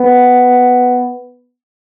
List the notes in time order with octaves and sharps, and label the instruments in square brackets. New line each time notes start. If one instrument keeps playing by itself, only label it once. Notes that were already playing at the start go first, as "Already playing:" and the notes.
Already playing: [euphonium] B3